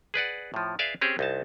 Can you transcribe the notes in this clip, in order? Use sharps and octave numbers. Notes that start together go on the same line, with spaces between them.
G#4 B4 D5 F#5
A2 F3
G#4 B4 D5 E5 F5
C4 C#4 G4 G#4
C2 D#4 A5